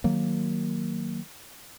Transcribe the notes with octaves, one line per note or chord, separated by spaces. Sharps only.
D#3 F#3 A#3